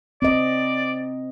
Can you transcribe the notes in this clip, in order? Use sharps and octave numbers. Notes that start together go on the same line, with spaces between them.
C4 D5 D#5